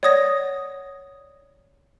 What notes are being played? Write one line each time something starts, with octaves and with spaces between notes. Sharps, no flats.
C#5 D5 F#5 D#6 G#6 A#6